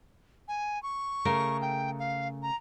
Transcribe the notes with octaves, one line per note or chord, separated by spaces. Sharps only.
G#5
C#6
C#3 A3 A#4
G5
F5
A#5